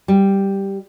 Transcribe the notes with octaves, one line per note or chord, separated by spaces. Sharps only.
G3